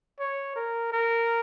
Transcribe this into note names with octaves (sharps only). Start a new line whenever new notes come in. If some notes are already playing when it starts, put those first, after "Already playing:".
C#5
A#4
A#4